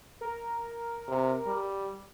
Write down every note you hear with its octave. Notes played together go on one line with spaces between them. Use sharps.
A#4
C3
G3